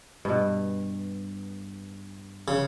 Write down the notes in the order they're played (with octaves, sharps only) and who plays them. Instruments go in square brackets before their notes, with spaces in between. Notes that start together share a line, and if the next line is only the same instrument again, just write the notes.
[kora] G2 B2
[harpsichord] C#3